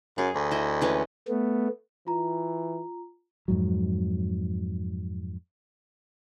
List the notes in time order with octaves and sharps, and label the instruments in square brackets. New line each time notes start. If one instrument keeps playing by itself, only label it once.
[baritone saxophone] F#2 [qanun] G#4
[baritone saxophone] D2
[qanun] E4 D#5
E3 G#3 C#4
[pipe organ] A3 B3
[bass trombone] E3 [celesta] F4 A#5
[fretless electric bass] F2 G#2 F#3